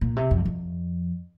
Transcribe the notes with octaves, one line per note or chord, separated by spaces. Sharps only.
A#2
C3
F2
F2